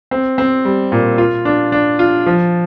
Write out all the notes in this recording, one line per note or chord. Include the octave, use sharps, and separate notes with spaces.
C4
C4
G3
A#2
F4
D4
D4
F4
F3